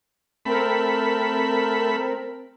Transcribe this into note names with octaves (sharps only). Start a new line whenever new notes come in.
A3 C4 A#4 B5